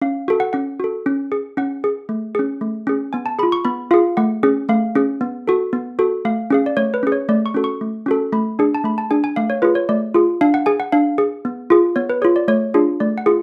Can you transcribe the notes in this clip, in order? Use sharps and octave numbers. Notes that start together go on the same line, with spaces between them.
C#4 F5
F#4 A4
F#5
C#4 F#5
F#4 A4
C#4
G#4
C#4 F#5
G#4
A3
C#4 G#4
A3
C#4 G#4
B3 G#5
A5
F4 G#4 B5
C#6
B3 B5
F4 G#4 F5
A3 F#5
C#4 G#4
A3 F5
C#4 G#4
B3
F#4 A4
B3
F#4 A4
A3 F5
C#4 G#4 F5
D5
A3 C#5
B4
C#4 G#4
C#5
A3 D5
C#6
C#4 F#4 A4
C#6
A3
C#4 F#4 A4
A3 B5
D4 G#4
A5
A3 B5
A5
D4 G#4 G#5
G#5
A3 F5
C#5
F4 G#4 B4
C#5
A3 D5
F4 G#4
D4 F5
F#5
G#4 G#5
F#5
D4 F5
G#4
B3
F4 G#4
B3 C#5
B4
F4 G#4 C#5
D5
A3 C#5
D4 F4 G#4
A3 D5
F#5
F4 G#4